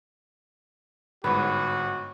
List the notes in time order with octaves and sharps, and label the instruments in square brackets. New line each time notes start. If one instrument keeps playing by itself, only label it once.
[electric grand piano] G1 G#2 [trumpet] F#4 [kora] B4 C#5